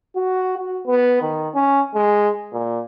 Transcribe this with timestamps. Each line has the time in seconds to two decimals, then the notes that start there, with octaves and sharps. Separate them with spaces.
0.16 F#4
0.58 F#4
0.87 B3
1.22 D#3
1.55 C#4
1.94 G#3
2.53 A#2